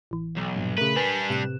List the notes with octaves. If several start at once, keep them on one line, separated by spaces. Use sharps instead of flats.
A1 E3
B1
G2 A#2
C#3 A3 A#4 B4
G3 D4 B4 G#5 B6 C7
A2 C3 F#6 E7